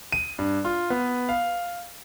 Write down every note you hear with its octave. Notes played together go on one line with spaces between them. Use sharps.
D#7
G2
F4
B3
F5